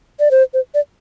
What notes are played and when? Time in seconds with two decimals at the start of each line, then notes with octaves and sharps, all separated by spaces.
0.20 D5
0.31 C5
0.54 C5
0.74 D5